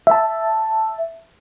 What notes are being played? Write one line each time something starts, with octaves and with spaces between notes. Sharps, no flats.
E5 A5